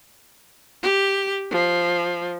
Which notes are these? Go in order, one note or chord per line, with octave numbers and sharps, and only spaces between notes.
G4
F3